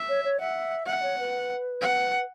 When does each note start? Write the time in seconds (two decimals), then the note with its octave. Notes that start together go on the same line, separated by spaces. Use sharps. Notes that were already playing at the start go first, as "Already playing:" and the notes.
Already playing: E5
0.09 C#5
0.24 C#5
0.40 E5 F#5
0.86 E5 F#5
1.02 C#5
1.19 B4
1.81 F#5